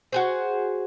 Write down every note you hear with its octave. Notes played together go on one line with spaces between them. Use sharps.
F#4 G#4 C5